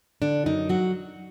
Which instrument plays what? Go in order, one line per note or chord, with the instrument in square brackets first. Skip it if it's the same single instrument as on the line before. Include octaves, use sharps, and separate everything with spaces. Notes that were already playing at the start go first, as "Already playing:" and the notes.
[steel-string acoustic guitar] D3 D4
F#2 D#4
F#3 F#4